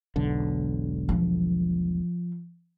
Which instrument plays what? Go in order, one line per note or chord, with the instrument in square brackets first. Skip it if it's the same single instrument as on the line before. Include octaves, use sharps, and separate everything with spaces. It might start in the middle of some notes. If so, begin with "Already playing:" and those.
[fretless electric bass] E1 B1 D3
[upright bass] F3